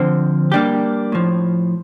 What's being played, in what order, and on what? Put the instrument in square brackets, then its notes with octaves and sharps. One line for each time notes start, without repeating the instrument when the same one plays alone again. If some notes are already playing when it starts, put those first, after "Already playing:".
Already playing: [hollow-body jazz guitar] D3 F3 C4
G3 A#3 D4 G4
A2 F3